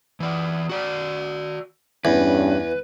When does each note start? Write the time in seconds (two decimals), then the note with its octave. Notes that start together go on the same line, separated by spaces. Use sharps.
0.20 E3 D5
0.69 F#4 D5
2.05 E2 G2 C#4 B4